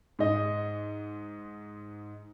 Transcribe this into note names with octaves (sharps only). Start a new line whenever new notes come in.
G#2 D#5